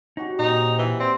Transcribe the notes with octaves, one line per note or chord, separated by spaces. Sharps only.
C#4 D#4 F#4 G4
A#2 A#3 C4 D#4
E3
C4 C5 D5